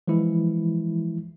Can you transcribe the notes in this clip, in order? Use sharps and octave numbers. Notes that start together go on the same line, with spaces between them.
E3 F3 G#3 E4